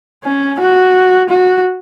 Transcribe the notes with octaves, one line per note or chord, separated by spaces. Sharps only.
C#4
F#4
F#4